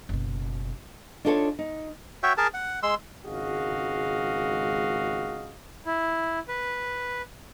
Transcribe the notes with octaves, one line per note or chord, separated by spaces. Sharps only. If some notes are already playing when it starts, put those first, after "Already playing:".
F#1 B2
D4 D#4 F4 A4 C5 C#5
D#4
F#4 C#5 E5 G5
G#4 A#4 A5
F#5
G#3 C6 E6
G#1 C#2 F#4 G#4 D#5 F5
E4
B4